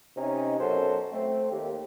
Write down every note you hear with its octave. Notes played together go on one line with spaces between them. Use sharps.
C3 C#4 D#4
F#2 B2 F#3 A4 C5
A3 C4
D#2 G4